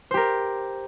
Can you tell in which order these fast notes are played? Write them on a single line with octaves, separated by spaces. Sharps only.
C5 G4 A#4